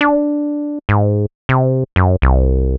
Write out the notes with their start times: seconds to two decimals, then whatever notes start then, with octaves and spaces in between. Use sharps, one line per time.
0.01 D4
0.89 G#2
1.49 C3
1.96 F#2
2.22 C2